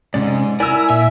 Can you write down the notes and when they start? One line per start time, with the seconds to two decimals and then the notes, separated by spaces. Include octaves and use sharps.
0.14 G#2 C3 C#4 D5
0.60 E4 A#4 D5 G#5 E6
0.90 A#2 E5